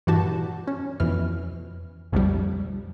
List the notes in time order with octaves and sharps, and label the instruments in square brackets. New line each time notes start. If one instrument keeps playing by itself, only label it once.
[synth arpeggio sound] G2 A#2 E3 F#4 G4 A5
C#4
F2 B2 E3 F6
B1 F2 A2 D3 F3 G3